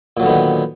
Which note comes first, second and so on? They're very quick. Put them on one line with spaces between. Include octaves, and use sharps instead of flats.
A#2 F#3 D3 B3 D#3